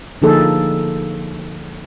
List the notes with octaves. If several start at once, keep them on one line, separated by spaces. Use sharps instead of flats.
D3 F3 A#3 D#4 G#4 A4